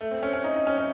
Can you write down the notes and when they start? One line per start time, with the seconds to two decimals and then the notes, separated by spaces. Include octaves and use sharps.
0.01 A3
0.11 C4
0.23 C#4
0.33 C#4
0.44 D#4
0.56 D#4
0.67 C#4
0.78 C#4